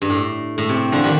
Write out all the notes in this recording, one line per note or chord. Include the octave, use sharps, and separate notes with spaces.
G2
A2
A2
C3
D3 F3
D#3 G3